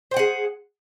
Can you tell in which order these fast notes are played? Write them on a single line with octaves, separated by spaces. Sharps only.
C5 G5 F#5 G#4